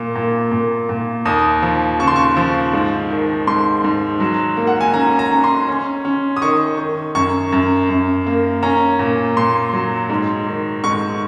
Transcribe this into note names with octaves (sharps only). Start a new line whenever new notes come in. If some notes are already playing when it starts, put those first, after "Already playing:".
Already playing: A#2
A#2
A#2
A#2
D#2 D#6
F3
C#3 C#6
C6
C#6
F3
G#2
D#3
G#2 C6
G#2
F#3
A#3
F#5
G#5
C#4 A#5
A#5
C#4
C6
C#4
C#4
D#6
D#3 C#6
D#3
F#2 C#6
F#2
F#2
A#3
C#4 A#5
A#2
A#2 C6
F#3
G#2
D#3
G#2 C#6